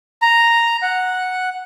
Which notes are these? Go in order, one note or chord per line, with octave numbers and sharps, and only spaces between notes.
A#5
F#5